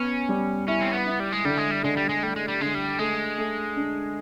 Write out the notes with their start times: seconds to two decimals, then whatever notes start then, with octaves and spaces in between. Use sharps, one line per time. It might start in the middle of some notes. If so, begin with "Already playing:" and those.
Already playing: B3 C#4
0.29 G3
0.68 C#4 E4
0.81 C4
0.93 B3
1.07 E4
1.20 G3
1.33 G#3
1.45 D3 G3
1.58 G#3
1.71 G3
1.83 D3 G#3
1.97 G3
2.09 G#3
2.22 G3 A3
2.36 G#3
2.48 G3
2.61 D3 G#3
2.75 G3
2.99 G#3 A3
3.38 A3
3.76 D4